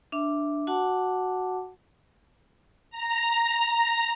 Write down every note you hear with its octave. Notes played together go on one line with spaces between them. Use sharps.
D4 E5 D6
F#4 F#5 A5 D6
A#5